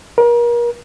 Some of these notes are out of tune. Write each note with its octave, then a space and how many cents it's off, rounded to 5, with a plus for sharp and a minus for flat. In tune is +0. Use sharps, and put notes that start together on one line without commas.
A#4 +35